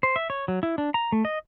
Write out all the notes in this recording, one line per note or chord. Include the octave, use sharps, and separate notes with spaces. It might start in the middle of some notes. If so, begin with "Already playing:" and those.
C5
E5
C#5
F#3
E4
D4
A#5
A3
D#5